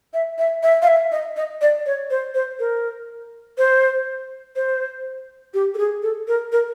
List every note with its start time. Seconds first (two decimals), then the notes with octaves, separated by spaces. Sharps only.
0.14 E5
0.38 E5
0.63 E5
0.82 F5
0.88 E5
1.12 D#5
1.37 D#5
1.61 D5
1.86 C#5
2.10 C5
2.35 C5
2.59 A#4
3.58 C5
4.56 C5
5.54 G4
5.74 A4
5.78 G#4
6.03 A4
6.28 A#4
6.52 A#4